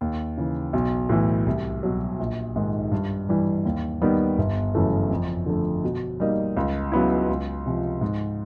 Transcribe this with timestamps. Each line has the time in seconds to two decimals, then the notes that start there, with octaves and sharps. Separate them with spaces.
0.01 D#2
0.38 C#3 E3
0.73 B1
1.09 A2 E3
1.47 C2
1.83 B2 F#3
2.19 A#1
2.56 G#2 D#3 G#3
2.91 G2
3.29 E3 G3
3.65 D#2
4.02 D#3 G3 B3
4.38 G1
4.75 F#2 C#3 E3 A3
5.10 F2
5.46 D3 F3 A3
5.84 B2
6.20 G3 A#3 D#4
6.57 C#2
6.92 C#3 F#3 B3 E4
7.29 C#2
7.66 C3 F3
8.01 G#2